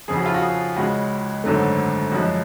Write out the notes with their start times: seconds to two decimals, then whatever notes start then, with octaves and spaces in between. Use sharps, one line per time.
0.08 F2 C#3 F3 G#4
0.17 F#4
0.26 F4
0.34 F#4
0.42 G#4
0.76 C#2 C#3 G#3 F#4
1.44 G#1 F#2 D3 F#3 A3
2.12 F#2 F3 G#3 F#4